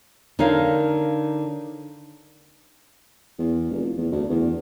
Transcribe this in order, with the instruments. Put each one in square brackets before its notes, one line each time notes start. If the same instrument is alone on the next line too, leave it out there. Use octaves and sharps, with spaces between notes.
[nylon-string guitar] D3 D#4 A#4 C#5 F5
[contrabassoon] E2
F1
E2
D2
E2